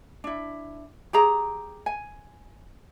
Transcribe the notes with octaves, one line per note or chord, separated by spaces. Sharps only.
D4 E4
G4 G#4 A#5
G#5